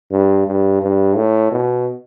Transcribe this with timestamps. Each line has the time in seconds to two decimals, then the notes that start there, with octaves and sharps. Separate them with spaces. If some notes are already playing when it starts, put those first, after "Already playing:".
0.12 G2
0.47 G2
0.81 G2
1.16 A2
1.52 B2